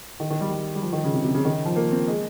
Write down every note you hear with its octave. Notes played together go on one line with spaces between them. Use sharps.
D#3
D#3
G3
G3
G3
F3
D#3
C#3
C3
C3
C#3
D#3
F3
A#3
C4
G#3